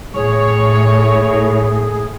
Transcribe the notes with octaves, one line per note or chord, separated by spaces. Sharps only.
A2 G#4 C#5